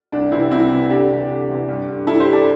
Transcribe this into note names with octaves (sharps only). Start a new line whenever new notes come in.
C2 D4
C3 E3 C4 E4
C2 C4 E4
C3 E3
D2 D4 G4
C3 E3
D2
C3 E3
G2
D3
G2 E4 A4
G4 C5
D3
A4 D5